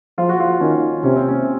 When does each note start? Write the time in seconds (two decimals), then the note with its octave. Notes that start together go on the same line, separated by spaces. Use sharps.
0.18 F3 F4
0.29 F#4
0.40 F4
0.61 D#3 C#4
1.04 C3 C#4
1.16 C4
1.28 C#4